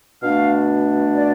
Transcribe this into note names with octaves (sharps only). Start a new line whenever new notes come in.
B2 A3 D4 F5
D5